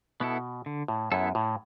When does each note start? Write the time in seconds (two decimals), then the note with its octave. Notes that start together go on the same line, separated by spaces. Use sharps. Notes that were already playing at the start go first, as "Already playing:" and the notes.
0.20 B2 B3 E4 A4
0.66 D3
0.88 A2
1.12 F#2 B3 E4 A4
1.35 A2